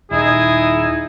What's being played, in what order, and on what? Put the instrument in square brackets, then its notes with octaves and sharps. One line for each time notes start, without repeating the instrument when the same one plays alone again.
[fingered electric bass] D#1 [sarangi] D#4 [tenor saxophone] E4 [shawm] G#4